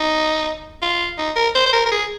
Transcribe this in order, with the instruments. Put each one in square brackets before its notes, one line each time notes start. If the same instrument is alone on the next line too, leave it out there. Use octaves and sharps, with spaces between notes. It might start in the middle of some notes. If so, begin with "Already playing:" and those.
Already playing: [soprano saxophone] D#4
F4
D#4
A#4
C5
C5
A#4
A#4
G#4